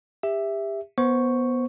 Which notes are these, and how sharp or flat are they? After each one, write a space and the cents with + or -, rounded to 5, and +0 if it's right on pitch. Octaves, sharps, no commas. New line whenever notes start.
G4 +30 E5 +0
B3 -10 C5 +0 C#6 +0